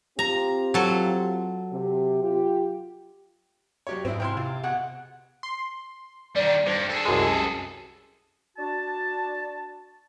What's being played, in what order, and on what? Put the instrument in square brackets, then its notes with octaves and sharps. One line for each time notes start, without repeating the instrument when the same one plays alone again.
[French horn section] C4 F4 G4 [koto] A#5
[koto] F#3 A4
[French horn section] C3 G4
F4 G4
[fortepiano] F#3 G4 C#5
[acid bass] G#2 [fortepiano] C4 E4
[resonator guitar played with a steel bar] C3 E4 F4 [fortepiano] G5 C6
[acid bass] C3 [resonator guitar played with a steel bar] F4
[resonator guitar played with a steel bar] B2 G#4 F#5
[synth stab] C6
[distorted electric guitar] D#3 G3 [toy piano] D5
[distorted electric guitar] G2 [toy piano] D#4 C5 D6
[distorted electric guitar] G#4 A4
[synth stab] C2 F#2 G#3
[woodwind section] D4 F#4 A5